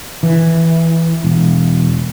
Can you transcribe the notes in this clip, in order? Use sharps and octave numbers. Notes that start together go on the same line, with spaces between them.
E3
E1